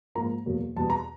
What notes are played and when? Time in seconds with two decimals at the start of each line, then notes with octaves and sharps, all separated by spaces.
0.15 G#2 F3 A#3 A#5
0.46 E2 B2 F#3 A#3
0.76 E2 B2 G3 B3 A5
0.90 A#5